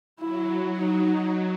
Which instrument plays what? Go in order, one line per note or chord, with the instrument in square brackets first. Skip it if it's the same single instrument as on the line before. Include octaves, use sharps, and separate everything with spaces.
[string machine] F#3 [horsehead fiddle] E4
[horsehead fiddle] D#4